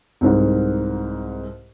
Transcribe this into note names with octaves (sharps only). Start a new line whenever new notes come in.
C2 G#2